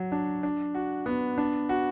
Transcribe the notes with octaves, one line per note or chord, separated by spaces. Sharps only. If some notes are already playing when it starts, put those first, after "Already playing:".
Already playing: F#3 F#4
D4
D4
F#4
B3
D4
F#4